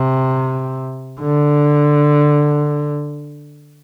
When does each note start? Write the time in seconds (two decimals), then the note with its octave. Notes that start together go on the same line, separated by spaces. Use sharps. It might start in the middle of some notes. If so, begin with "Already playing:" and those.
Already playing: C3
1.21 D3